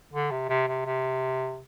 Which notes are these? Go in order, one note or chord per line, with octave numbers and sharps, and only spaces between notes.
D3
C3
C3
C3
C3